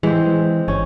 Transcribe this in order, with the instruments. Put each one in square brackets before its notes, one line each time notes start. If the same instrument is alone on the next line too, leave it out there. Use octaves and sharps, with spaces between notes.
[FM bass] E3 [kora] G#3 C4
[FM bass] G1 [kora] C#4